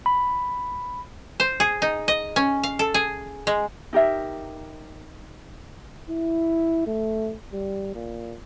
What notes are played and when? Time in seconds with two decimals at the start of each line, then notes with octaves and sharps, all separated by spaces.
0.06 B5
1.40 C5
1.60 G#4
1.82 D#4
2.08 D#5
2.36 C#4
2.63 F5
2.79 A4
2.94 G#4
3.47 G#3
3.93 D#4 G4 A#4 E5
6.10 E4
6.87 A3
7.52 G3
7.95 A#2